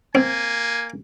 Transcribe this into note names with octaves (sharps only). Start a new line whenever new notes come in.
A#3 C4 G#5